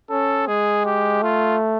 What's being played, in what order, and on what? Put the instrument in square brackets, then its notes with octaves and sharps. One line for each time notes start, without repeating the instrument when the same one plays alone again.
[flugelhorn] C#4 [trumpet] A4
[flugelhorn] G#3 [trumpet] G#4
[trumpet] G4
[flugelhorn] A3 [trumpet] F4